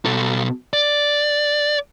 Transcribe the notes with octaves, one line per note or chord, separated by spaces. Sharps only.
B2 A4
D5